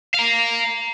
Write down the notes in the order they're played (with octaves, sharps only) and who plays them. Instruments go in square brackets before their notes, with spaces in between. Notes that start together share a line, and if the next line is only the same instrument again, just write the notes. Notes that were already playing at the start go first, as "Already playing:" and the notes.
[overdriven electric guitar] F5 A#5